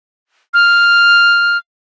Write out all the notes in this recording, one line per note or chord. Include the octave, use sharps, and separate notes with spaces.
F6